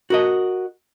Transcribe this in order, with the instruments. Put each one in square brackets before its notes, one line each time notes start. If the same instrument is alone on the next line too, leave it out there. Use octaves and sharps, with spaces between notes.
[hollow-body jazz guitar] F#4 A#4 D#5